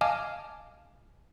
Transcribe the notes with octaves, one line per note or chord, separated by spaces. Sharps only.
D#5 F5 G#5 A5 D6 F6